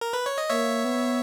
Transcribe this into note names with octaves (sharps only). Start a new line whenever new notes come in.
A#4
B4
C#5
D#5
A#3 C#5 E5
B3